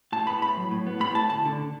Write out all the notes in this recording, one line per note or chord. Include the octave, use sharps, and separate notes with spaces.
A2 A5
B3 B5
A2 B5
F#3
A2
B3
A2 B5
A2 A5
D2 A5
D3